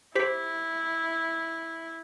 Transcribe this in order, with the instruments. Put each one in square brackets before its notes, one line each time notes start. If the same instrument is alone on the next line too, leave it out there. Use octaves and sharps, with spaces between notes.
[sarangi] E4 [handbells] G4 C5 B6